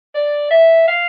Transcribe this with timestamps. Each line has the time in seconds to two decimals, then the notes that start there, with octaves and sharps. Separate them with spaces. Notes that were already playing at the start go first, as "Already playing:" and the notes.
0.15 D5
0.51 E5
0.88 F5